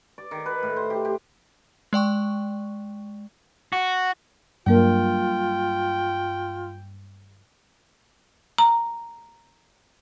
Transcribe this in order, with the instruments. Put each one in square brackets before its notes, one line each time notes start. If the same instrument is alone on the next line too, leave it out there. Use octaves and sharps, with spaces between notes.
[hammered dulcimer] D5
D#3
B4
A2
C5
G4
G4
[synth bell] G#3 D5 G5 C#6
[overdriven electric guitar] F#4
[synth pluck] G2 [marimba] F#3 A#3 A#4 [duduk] F4 [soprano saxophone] G5
[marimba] A#5